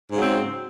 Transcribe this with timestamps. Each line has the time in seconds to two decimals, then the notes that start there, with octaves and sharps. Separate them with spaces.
0.09 G#2
0.13 C#3
0.17 F#3
0.21 C4